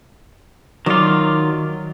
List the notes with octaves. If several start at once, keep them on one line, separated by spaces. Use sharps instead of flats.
D#3 F#3 F4 D5